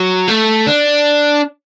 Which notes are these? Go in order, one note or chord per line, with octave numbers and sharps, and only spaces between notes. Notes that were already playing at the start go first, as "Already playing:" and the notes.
Already playing: F#3
A3
D4